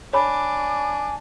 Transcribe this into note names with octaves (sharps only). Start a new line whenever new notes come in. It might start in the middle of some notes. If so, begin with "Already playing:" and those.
D4 C#5 G#5 B5 D6